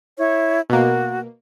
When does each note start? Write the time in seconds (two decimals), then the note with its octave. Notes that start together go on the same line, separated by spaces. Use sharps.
0.18 E4 C#5
0.70 B2 A#3 F#4